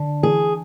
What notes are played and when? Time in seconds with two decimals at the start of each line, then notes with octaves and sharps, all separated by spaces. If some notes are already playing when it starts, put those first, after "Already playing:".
Already playing: D3 D4
0.23 E3 G#4